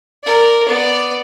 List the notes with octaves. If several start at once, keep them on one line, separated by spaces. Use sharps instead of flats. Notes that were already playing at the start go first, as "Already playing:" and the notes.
A#4 D5
B3 D5